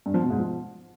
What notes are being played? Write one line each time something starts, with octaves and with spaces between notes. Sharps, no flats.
G2
F3
B2
G#2
F3